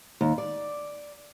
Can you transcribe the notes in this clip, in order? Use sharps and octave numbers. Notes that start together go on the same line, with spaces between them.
D#2
D5